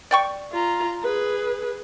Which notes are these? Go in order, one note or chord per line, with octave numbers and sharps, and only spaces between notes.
D5 G5 C#6
F4 A#5
G#4 B4